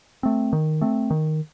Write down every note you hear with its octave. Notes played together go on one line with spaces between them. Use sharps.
A3 C4
D#3
A3 C4
D#3